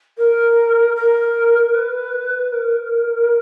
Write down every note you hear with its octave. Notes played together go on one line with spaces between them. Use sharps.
A#4
A#4
B4
A#4